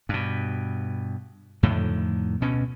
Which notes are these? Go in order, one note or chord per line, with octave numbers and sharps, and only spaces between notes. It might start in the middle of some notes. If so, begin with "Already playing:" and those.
G2 B2
F2 A2 D3 D#3
D2 B2 C#4